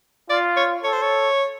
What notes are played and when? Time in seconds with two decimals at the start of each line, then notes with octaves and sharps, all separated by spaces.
0.30 F4 D5
0.57 C#5
0.84 A4 C#5
0.93 C5
1.02 C#5